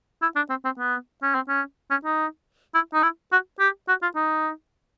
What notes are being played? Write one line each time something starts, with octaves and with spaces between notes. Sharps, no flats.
E4
D4
C4
C4
B3
C#4
C4
C#4
C#4
D#4
E4
D#4
E4
F#4
G4
F#4
F4
D#4